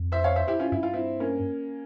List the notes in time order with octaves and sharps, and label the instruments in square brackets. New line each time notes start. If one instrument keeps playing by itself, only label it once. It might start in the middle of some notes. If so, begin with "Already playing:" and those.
Already playing: [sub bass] F2
[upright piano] C5 E5
C#5 F5
C5 E5
E4 G4
C#4 F4
[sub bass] G2 [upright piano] E4
[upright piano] F4
C4 E4
A#3 C#4